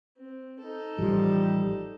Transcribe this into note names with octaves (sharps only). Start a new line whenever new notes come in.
C4
D#4 A4
A1 F3 G3